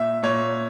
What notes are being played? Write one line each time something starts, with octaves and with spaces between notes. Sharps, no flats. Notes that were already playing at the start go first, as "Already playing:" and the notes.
Already playing: A#2 E5
A#2 C#5